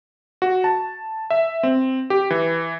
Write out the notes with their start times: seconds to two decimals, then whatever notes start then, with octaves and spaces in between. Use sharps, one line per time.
0.42 F#4
0.64 A5
1.30 E5
1.63 C4
2.10 G4
2.30 E3